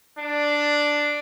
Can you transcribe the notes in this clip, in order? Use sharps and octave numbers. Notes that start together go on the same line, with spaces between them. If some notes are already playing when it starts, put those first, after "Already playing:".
D4